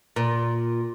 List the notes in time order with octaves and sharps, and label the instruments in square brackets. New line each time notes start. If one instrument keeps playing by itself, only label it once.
[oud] A#2